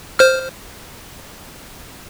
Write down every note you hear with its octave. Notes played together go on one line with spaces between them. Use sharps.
C5 F6